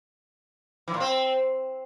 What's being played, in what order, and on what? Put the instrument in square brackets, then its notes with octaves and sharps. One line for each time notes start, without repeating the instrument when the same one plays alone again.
[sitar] E3
A#2
C4